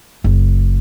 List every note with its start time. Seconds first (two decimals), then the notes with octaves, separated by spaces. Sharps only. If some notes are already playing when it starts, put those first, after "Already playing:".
0.24 F#1